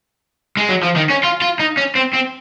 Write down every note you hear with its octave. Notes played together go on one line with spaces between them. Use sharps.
G#3
F#3
F3
D#3
C#4
F4
F4
D#4
C#4
C4
C4